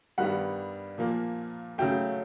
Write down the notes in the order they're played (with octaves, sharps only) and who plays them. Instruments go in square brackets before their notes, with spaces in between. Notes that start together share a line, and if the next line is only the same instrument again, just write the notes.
[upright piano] G2 D#3 G3 B3 F#5
A#2 F3 A#3
C#3 F#3 A3 G5